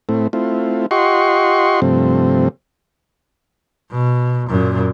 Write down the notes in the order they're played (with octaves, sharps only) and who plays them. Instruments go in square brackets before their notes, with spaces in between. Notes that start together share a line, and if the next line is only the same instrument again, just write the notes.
[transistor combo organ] A2 A3 C4 E4
A3 C4 E4 F4
F4 G4 D#5 F#5 C6 C#6
G2 C3 F3 A3 C4
[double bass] B2
F#2 A#2